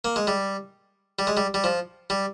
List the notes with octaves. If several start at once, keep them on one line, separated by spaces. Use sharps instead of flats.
A#3
G#3
G3
G3
G#3
G3
G3
F3
G3